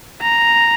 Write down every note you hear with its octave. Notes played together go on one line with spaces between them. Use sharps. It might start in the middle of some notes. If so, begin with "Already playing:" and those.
A#5